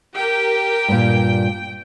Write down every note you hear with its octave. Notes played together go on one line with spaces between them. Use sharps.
G4 A#4 G5
G2 A#2